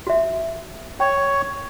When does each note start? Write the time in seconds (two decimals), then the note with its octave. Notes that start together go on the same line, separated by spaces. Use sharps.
0.07 F#4 E5
1.00 C#5 G5